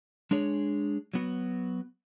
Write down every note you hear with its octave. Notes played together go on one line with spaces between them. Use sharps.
G#3 D4 G#4 C#5
F#3 B3 F#4